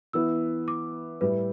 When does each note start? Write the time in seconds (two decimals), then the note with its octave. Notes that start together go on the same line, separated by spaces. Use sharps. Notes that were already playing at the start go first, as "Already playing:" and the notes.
0.13 E3 B3 E4 E6
0.68 D6
1.21 A2 G3 E4 B4